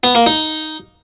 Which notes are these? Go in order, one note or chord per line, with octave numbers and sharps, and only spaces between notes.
B3
A#3
D#4